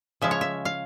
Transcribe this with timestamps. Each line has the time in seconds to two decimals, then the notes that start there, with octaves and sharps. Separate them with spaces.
0.22 C#3 F3 G#3 E5
0.31 C#5
0.41 E5
0.65 F5